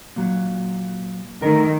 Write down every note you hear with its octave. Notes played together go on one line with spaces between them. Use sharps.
A#2 F#3
D#3 A3 A#4